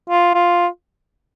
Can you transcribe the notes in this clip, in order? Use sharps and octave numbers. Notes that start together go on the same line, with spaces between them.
F4
F4